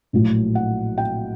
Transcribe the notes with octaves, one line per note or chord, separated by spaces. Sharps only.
A#1 A2 F#3 A3
F#5
G5